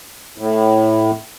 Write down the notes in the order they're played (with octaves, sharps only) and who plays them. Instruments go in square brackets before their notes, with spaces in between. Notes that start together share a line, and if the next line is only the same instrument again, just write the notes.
[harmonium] A2